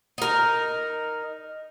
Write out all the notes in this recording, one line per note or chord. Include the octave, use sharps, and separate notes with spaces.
D#4 A#4